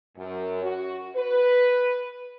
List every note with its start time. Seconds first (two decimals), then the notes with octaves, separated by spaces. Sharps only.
0.17 F#2
0.63 F#4
1.16 B4